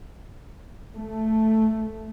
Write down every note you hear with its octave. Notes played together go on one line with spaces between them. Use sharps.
A3